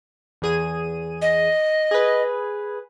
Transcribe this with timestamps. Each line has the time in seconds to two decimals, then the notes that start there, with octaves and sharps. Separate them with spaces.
0.42 E2 G#4 D#7
1.22 D#5
1.91 G#4 B4